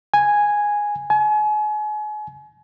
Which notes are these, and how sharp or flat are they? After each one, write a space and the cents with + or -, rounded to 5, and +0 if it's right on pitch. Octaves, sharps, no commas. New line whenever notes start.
G#5 -5
G#5 +35